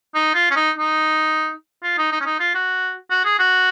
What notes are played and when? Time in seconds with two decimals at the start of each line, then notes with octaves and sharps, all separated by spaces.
0.15 D#4
0.35 F4
0.51 C#4
0.56 D#4
0.78 D#4
1.83 F4
1.98 D#4
2.12 D#4
2.21 C#4
2.26 D#4
2.40 F4
2.55 F#4
3.11 F#4
3.25 G#4
3.39 F#4